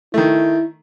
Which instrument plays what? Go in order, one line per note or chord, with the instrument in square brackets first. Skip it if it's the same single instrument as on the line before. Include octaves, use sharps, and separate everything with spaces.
[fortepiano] D#3 A3 [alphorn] E4